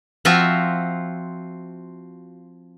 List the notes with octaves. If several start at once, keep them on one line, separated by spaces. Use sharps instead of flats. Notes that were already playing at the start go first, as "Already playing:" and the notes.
F3 C4 F4 F#4 E5